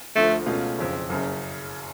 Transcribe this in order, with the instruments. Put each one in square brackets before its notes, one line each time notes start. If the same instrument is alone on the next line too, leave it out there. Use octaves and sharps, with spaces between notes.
[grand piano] D2 D3 F3 [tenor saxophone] A3
[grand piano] C#2 B2 A3 C#4 F4
F#1 F2 C#3
F#1 F#2 C#3